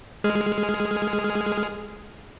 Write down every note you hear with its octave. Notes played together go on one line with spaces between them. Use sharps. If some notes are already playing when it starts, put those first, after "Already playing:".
G#3 G#4 F6